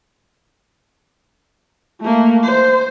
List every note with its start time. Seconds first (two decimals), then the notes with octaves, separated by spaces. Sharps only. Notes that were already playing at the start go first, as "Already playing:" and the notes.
2.01 A3 A#3
2.44 C5